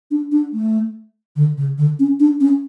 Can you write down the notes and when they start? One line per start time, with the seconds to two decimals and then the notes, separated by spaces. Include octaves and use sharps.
0.11 D4
0.32 D4
0.53 A3
1.36 D3
1.57 C#3
1.78 D3
1.99 C#4
2.20 D4
2.41 C#4